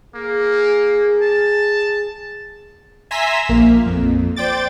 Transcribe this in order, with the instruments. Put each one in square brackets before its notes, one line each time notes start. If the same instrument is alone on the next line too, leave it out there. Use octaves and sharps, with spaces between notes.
[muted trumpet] A#3 [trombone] G#4
[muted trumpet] A5
[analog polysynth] E5 G#5 A#5 C6 E6 B6
A#1 A#3
F2
C5 D5 G5 D6 A6